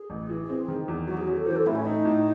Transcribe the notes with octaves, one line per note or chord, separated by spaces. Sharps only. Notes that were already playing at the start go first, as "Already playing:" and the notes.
Already playing: G#4
A1
E3
C4
D#3
E2
F#3 F#4
G#4
C#4 F#4
A4
E3 C5
A4
A2 E4
C#4
A3 D#4
A2